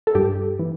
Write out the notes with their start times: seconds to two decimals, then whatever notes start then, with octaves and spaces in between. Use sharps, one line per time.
0.07 A4
0.15 G2 G4
0.59 E3